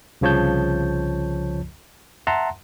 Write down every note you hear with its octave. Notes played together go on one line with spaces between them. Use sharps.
C2 C#3 F3 C#5 A5 G6
E5 F#5 A5 A#5 C6